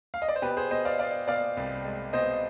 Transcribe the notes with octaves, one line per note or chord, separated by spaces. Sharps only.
F5
D#5
D5
C5
B2 G4 B4
G#4 C5
B2 C5 D#5
D5 F5
B3 D5 F5
B2 D5 F5
C2
G#3
B2 C5 D#5